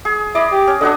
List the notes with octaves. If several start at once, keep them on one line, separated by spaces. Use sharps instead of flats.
G#4
E4 D5 D#5
G4
C#4
D3 D4 F#4 D#5